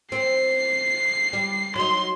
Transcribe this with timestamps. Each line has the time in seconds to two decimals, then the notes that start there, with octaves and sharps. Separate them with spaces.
0.12 C4 C7
1.33 G3
1.76 F#3 D#4 C6